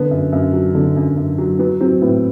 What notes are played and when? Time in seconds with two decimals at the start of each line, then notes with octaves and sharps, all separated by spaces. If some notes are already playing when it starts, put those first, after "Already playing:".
Already playing: D3 B3
0.11 F#2
0.32 F#2
0.53 F#3
0.75 D3
0.96 F#2
1.17 F#2
1.38 F#3
1.59 F#3 B3
1.80 F#3 C4
2.01 A2 B3